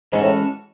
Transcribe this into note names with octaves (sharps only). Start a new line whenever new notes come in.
G#2 E3 G#3 C#4 F#4 A4
A2